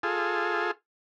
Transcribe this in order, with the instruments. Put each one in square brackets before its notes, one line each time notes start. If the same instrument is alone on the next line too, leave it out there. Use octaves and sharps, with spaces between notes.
[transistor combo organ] F4 G#4 A4